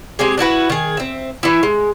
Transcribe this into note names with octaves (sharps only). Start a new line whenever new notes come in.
G#3 C4 G4 G#4
D4 E4 F#4 B4
D#3 G#4
C4 E5
E3 E4
G#3